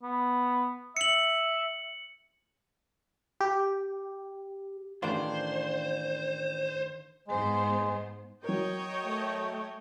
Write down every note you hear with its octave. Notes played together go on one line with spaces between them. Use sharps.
B3
E5 C#7 F#7
G4
A1 D#3 D4 F4 C5
G#2 G#3 B3 C5
F#3 A#4 C#5 D#5 G5
A3